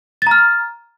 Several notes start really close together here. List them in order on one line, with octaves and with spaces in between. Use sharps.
A6 A#5 F6